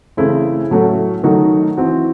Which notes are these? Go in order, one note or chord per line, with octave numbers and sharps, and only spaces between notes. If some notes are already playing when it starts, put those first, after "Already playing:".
C#3 E3 A3 C4 E4
A2 F#3 A3 C#4 F#4
D#3 F#3 A3 D#4 F#4
E3 C4 F#4